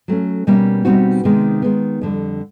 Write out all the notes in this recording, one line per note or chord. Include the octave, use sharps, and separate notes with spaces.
F#3 A3 C#4
B2 G3 A#3 C#4
B2 G3 C4 D#4 F#4
C3 D#3 G#3 B3
D#3 G#3 B3
F2 D3 G3